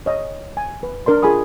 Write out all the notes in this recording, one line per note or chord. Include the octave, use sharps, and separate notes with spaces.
C#5 D#5
G#5
B4
D4 A#4 D5 C6
F4 G#4 F#5 G#5 B5 D#6